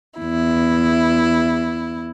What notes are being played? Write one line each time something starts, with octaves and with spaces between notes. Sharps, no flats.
E2 E4